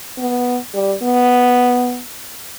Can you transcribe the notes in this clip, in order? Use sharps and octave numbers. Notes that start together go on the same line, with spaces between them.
B3
G3
B3